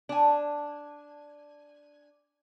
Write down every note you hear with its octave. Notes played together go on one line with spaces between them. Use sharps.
D4 G#5